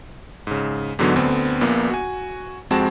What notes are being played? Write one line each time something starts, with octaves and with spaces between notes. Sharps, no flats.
G#2 C#3
E2 G#2 B2 D3 F#3 B3
D2 D3 B3 C4
A#1 A#2 A#3 B3
F#4 G#5
F2 G#3 C4 F#4 A5 E7